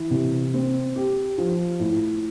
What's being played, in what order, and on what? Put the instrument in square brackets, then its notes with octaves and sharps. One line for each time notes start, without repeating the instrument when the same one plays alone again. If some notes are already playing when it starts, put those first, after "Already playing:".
Already playing: [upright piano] E3
C3
C4
G4
F3
A2